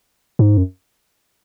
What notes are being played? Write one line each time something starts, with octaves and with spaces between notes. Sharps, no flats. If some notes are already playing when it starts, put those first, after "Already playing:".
G#2
F#2